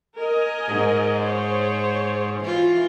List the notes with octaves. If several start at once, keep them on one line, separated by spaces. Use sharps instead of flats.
A#4 D#5 G#5
G#2
C5 C#5
E3 F4